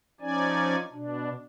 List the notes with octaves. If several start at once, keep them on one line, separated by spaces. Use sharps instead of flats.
F3 C#4 D#4 D5 G#5
B2 D4